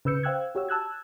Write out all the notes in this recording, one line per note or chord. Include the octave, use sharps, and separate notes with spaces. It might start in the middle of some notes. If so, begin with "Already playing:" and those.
C#3 B4 E6 G6 C#7
C5 F5 G5 E6 F#6 G#6
F#4 G4 C#5 F#5 E6
A5 E6 F#6 G#6